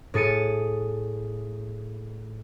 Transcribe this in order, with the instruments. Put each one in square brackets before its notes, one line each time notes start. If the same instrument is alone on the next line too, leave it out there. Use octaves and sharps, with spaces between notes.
[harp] A2 G#4 A6 C#7 D#7